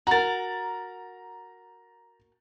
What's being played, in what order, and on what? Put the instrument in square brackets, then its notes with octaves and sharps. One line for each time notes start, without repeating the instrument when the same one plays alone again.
[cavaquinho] F#4 A#4 [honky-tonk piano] A#5 A6